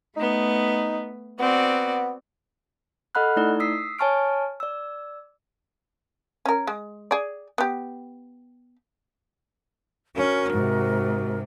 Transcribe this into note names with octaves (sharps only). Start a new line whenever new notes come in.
A3 B3 D#4
B3 C4 F#4 D5
A4 D#5 F#5 B5 F6 F#6
A3 D#4 E4 D5
D#6 E6 B6 C7
C#5 G#5 A5 C#6 F6 D7
D5 E6
C#4 A#4
G#3
G#4 D5
B3 G4
C#4 F#4 A#4
G#2 C3